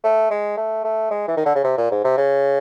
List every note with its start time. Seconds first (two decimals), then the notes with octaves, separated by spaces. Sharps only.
0.04 A3
0.31 G#3
0.57 A3
0.84 A3
1.11 G#3
1.28 E3
1.37 D#3
1.46 D3
1.55 C#3
1.64 C3
1.78 A#2
1.91 G#2
2.04 C3
2.18 C#3